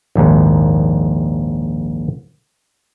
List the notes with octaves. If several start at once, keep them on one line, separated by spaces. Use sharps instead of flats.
A#1 D#2 G#2